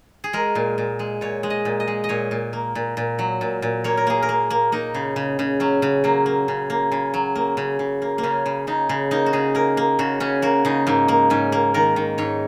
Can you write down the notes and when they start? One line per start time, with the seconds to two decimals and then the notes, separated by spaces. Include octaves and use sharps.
0.24 G#4
0.33 G#3 A#4
0.55 A#2
0.78 A#2
0.99 G#3
1.21 A#2 C#5
1.43 G#3
1.50 D#5
1.65 A#2
1.80 D#5
1.87 G#3
2.04 D#5
2.09 A#2 C#5
2.31 A#2
2.53 A#3
2.75 A#2
2.97 A#2
3.19 F#3
3.41 A#2
3.62 A#2
3.84 A#3 C#5
3.97 A#4
4.07 A#3 G#4
4.22 A#4
4.29 A#3
4.50 A#3
4.72 A#3 D#4
4.94 C#3
5.16 C#3
5.39 C#3
5.60 F#3 C#4
5.82 C#3
6.04 F#3 A#3
6.26 A#3
6.48 C#3
6.70 A#3
6.92 C#3
7.14 F#3
7.35 A#3
7.57 C#3
7.79 C#3
8.02 A#3
8.18 A#3
8.23 C#3 C#4
8.46 C#3
8.67 C#3 D#4
8.89 C#3
9.11 A#3 D#4
9.26 F#4
9.33 C#3 G#4
9.55 A#3 A#4
9.77 A#3
9.99 C#3 F#4
10.20 C#3 C#4
10.42 A#3 F#4
10.65 C#3 D#4
10.87 G#2 A#3
11.08 A#3
11.30 G#2 C#4
11.52 A#3
11.74 D#3 A#4
11.96 D#3
12.18 G#2 C#5